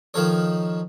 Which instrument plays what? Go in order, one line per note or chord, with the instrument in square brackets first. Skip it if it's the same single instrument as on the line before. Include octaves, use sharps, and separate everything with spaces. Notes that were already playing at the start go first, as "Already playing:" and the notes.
[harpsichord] D#3 F3 A4 C#5